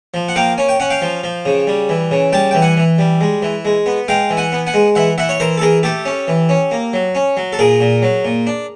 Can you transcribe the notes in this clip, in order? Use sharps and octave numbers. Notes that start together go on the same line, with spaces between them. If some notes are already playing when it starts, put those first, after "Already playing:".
F3
F#5
A#3 F5 G5
C#4 G#5
G5
C#4 F#5
F5 G5
F3
F3
C#3
G3
E3
C#3
G3 G5 A5
E3 G5
F#5 G#5
E3
G3
G#3
E3
G#3
B3
G#3 F5 G5
E3
F#5 G#5
B3
F#5 G#5
G#3
E3 E5 F#5
E3 E5 F#5
C#5
E3 A#4 C5
A4
E3 G#4 A#4
A3 G4 A4
C#4
E3
C#4
A#3
F#3
C#4
F#3
A4
A#2 G#4 A#4
A#2
F#3
A#2
D4